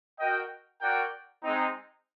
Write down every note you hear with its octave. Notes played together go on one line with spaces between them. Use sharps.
F#4 A#4 D#5 G5
F#4 A#4 D5 G5
G#3 C4 D#4